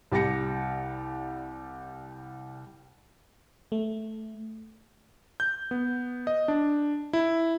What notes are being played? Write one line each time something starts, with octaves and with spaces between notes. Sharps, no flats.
C2 G3 G4 A#6 C#7
A3
G6
B3
D#5
D4
E4